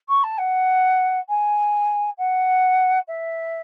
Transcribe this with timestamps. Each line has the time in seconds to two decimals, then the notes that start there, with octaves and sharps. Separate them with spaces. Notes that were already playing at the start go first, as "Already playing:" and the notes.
0.09 C#6
0.23 A5
0.38 F#5
1.29 G#5
2.18 F#5
3.08 E5